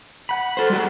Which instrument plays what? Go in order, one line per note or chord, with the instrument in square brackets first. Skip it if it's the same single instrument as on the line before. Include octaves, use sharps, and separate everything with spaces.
[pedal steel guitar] F#5 B5
[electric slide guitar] A4 C5
G3 G#3 F#4